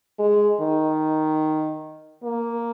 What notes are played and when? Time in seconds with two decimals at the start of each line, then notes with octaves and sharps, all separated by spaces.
0.19 G#3
0.61 D#3
2.24 A#3